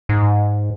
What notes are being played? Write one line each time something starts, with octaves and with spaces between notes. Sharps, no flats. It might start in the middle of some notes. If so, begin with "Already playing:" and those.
G#2